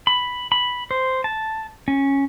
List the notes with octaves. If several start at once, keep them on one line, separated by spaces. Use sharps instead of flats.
B5
B5
C5
A5
C#4